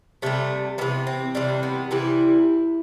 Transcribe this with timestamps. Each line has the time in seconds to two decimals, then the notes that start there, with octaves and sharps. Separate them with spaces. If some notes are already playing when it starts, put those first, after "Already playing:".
0.22 C3 E3 G3 A3
0.78 C3 E3 G3 B3
1.07 C4
1.35 C3 E3 G3 D4
1.63 B3
1.91 C3 E3 G3 E4